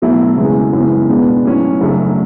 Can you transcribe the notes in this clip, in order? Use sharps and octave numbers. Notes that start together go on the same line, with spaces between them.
B2 F#3 A3 E4
E2 C#3 E3 G#3
F#2 C#3 E3 G#3
B2 G#3 B3 D4
A2 F#3 C#4
F#2 C#3 F#3 A3 D4